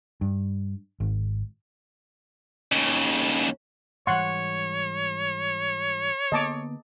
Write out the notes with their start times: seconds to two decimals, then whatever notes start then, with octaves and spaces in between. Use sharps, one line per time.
0.21 G2
1.00 G#1
2.72 D#2 C#3
4.07 G#2 E3 G3 C#5 F#5 C6 C#6
6.32 D3 A#3 B3 D#5 A5 D6